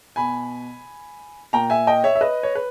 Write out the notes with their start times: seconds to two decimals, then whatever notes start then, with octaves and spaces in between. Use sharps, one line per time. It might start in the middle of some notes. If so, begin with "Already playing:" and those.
0.16 B2 G#5 B5
1.53 A#2 G5 A#5
1.70 E5 G#5
1.87 D#5 G5
2.04 C#5 E5
2.15 E5
2.21 B4 D#5
2.43 C#5
2.55 B4